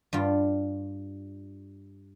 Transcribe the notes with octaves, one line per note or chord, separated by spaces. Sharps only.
G2 G3 F4